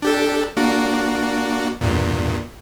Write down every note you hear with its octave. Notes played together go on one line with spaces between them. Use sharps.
D4 G4 A4
A#3 D4 F#4
E2 G2 A#2